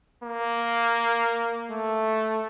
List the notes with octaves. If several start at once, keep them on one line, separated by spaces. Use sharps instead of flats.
A#3
A3